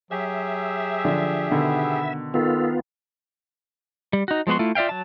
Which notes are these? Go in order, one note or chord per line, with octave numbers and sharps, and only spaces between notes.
F#3 G4 G#4 E5
D3 F3 D4
B2 D3 D#3 B3
D#3 B3 F4 A4
G3
D#4 F#4
F3 G#3 B3 F#4 C6
A3 E4 F4
F4 D5 E5 F5 G5
F#3 A5